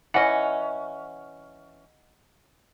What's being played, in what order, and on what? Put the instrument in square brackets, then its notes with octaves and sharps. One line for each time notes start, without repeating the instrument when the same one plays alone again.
[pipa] E3 C#4 [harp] D#5 F#5